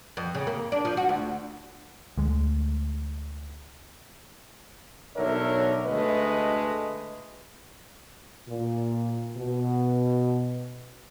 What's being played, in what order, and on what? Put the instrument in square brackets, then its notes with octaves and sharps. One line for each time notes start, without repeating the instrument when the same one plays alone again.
[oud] F2
C#3
A#3
D4
F3
F#4
D2
[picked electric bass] D2 G#3
[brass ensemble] B1 D3 A#4 C#5 E5
D2 G#3 A3 B4 D#5
[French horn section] A#2
B2